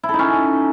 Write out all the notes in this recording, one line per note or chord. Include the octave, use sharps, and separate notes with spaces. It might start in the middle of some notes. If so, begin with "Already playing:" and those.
E4
A4
D#4
C#4